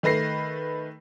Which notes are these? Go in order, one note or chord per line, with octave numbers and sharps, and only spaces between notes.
D#3 A3 B4 A#6 C7